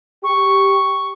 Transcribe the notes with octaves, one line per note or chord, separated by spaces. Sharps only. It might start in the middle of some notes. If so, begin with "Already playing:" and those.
G4 C#6